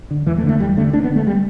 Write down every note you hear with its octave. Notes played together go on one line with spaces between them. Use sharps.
D3
E2 E3
A3
D3
A3
E2 G3
D3 A3
D2 D4
B3
D3
A3
G3